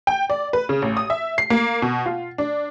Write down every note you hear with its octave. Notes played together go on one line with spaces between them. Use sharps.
G5
D5
B4
C#3
A1
D#6
E5
C7
A#3
B2
F4
D4